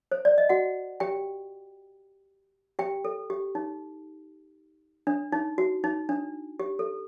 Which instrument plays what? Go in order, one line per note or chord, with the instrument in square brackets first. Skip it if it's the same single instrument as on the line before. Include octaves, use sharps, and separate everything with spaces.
[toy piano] C5
D5
D#5
F#4 F#5
G4 G5
G4 G5
A4
G4
D#4
D4
D#4
F#4
D#4
D4
G4
A4